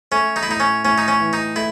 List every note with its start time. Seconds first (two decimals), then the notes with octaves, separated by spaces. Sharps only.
0.12 A3 C#4
0.36 D#4
0.43 E4
0.49 A2 D#4
0.60 C#4
0.85 A2 C#4
0.98 D#4
1.08 C#4
1.20 E3
1.33 D#4
1.56 A3 E4